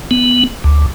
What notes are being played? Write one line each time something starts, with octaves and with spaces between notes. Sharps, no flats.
B3
D2